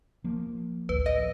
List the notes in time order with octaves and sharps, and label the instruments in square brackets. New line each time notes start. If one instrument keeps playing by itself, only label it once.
[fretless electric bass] F3 A#3
[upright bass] A1 D2 [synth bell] B4
[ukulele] D#5